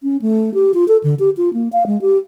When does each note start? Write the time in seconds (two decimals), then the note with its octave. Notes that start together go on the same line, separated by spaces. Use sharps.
0.03 C#4
0.21 A3
0.54 G4
0.74 F4
0.88 A4
1.03 D3
1.19 G4
1.37 F4
1.53 A#3
1.72 F5
1.86 G#3
2.01 G4